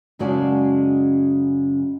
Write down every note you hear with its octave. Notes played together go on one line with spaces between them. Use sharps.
F#2 C#3 G#3 F#4 D5 A5